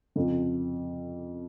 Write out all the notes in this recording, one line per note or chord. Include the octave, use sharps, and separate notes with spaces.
F2 C#3 F3